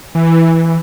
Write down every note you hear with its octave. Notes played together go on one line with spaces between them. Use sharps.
E3